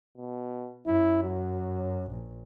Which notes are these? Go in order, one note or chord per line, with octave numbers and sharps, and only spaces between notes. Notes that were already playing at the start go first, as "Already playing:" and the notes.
B2
F#2 E4
F#3
A#1